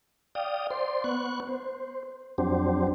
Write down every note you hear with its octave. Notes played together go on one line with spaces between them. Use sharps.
D5 F5 G5 D#6
C5 D5 C6
B3 C#6 F#6
C5
F2 F#3 C4 D4 G4 C5